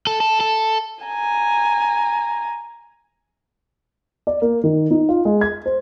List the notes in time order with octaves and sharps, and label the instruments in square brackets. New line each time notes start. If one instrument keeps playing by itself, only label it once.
[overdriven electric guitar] A4
A4
A4
[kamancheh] G#5 A#5
[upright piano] D5
A#3
D#3
D#4
F4
G#3
G#6
C5